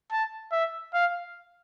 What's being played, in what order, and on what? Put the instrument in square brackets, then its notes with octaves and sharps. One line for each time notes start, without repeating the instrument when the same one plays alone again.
[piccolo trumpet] A5
E5
F5